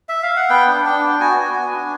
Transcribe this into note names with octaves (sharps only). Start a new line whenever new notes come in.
E5
F5
F#5
B3 G5
D4
D4 G5
B3
F#4 G#5
F#4
B3
D4